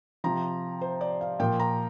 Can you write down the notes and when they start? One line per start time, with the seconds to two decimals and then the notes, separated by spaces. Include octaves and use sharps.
0.24 C3 F3 A#5
0.81 C5
1.01 D5
1.21 F5
1.39 A#2 F3 G5
1.60 A#5